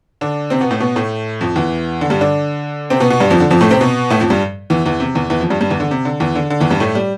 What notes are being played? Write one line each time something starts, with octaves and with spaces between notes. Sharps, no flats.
D3 D4
C3 C4
B2 B3
A2 A3
B2 B3
A2 A3
F2 F3
E2 E3
D3
G2 G3
D3 D4
C3 C4
B2 B3
B2 B3
G2 G3
F2 F3
D3
F2 F3
A2 A3
C3 C4
B2 B3
A2 A3
F2 F3
G2 G3
E2 E3
E2 E3
C3
E2 E3
E2 E3
F2 F3
G2 G3
G2 G3
E2 E3
D3
C3
D3
E2 E3
D3
D3
E2 E3
G2 G3
A2 A3
G3